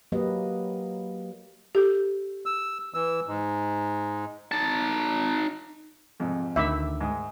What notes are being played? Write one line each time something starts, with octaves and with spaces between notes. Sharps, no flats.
F#3 A#3 G4 B4 D#5
G4 A4
E6
E3 E6
G#2
D#4 A5
F2 G#2 C3
D2 D#3 E5 G5 B5 D6
G#2 G#3 D#6